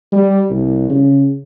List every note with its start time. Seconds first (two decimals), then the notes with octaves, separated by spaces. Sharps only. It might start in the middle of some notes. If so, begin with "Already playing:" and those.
0.12 G3
0.50 C2
0.90 C#3